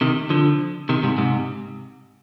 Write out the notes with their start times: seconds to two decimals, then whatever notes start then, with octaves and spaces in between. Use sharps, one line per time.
0.01 C3 D#3
0.30 D3 F3
0.89 C3 D#3
1.03 G#2 C3
1.18 G#2 C3